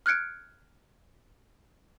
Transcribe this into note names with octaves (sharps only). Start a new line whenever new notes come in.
F6 F#6 G#6 C#7 D7